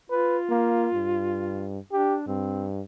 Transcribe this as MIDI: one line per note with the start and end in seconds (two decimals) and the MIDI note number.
0.10 1.71 65
0.10 0.37 71
0.50 0.89 58
0.94 1.79 43
1.92 2.23 62
1.92 2.16 67
2.27 2.81 43
2.27 2.66 60